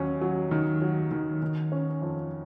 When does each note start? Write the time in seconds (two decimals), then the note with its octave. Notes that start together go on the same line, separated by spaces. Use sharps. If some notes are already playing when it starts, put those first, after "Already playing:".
Already playing: D#2 F#3 C#4
0.21 F#3
0.51 D#3
0.82 F#3
1.11 D#3
1.42 D#3
1.72 C#4
2.02 F2